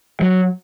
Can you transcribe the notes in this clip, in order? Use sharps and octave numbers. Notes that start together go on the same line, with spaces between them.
F#3